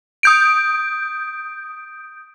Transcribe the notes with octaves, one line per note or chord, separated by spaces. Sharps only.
D#6 G6 D7